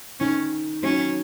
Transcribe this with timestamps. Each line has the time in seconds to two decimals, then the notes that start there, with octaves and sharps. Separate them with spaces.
0.20 D#3 C#4
0.83 D#3 F#3 C#4